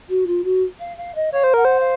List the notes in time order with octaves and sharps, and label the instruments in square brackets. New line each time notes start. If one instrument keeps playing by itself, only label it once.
[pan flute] F#4
F4
F#4
F5
F5
D#5
[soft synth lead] C#5 [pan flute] F5
[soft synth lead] C5
[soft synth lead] A#4 [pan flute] F#5
[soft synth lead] C5
[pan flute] F5